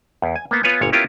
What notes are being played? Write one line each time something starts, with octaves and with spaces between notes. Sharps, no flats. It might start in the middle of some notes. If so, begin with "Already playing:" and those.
E2
G#5
A#3 B3
B3 F4 B4 C#5 G#5
G1 A#2 C#5
B3 C#4 E4 F4 G4 A#4